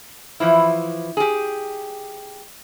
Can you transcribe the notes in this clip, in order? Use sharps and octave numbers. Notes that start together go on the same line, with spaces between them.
E3 F3 E4
G4 G#4